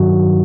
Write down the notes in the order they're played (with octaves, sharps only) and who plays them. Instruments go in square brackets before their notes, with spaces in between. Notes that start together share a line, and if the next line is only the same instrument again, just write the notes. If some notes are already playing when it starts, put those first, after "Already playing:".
Already playing: [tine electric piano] G2 D#3 F#3 F#4